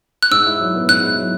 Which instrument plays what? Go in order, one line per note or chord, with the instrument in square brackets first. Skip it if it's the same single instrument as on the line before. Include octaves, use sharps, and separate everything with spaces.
[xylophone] F#6
[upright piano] G#2 [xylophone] E6
[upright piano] E4
F#3
B3
[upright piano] G#2 [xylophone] F#6
[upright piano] E4
F#3